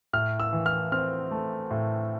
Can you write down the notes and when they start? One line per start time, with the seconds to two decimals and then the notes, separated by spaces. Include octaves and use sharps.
0.13 A2 F6
0.40 E6
0.53 E3
0.66 F6
0.92 C4 F6
1.31 A3
1.71 A2